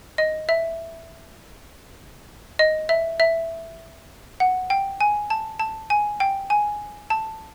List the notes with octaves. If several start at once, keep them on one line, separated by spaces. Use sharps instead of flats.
D#5
E5
D#5
E5
E5
F#5
G5
G#5
A5
A5
G#5
G5
G#5
A5